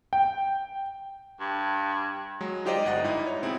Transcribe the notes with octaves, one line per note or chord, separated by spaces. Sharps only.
G5
G2
F#3 G#3
D#4 F4 G4 C5 D5 D#5
G1 D#5 F#5 A6
G#2 D#4 E4
C#5
B2 C4 E4 G#4